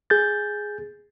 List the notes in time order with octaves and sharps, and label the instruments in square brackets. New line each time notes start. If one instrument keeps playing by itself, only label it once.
[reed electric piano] G#4 G6 A6